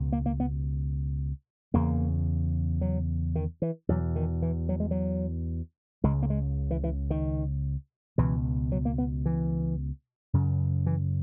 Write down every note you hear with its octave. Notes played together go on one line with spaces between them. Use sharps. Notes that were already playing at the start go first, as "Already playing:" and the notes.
Already playing: C#2 B2
A#3
A#3
B3
E2 C#3 A#3
F#3
D#3
E3
E2 B2 F#3
D#3
E3
F#3
G#3
F#3
C#2 C#3 G#3
A#3
G#3
E3
E3
D#3
C#2 B2 E3
F#3
A#3
B3
E3
F#2 C#3
E3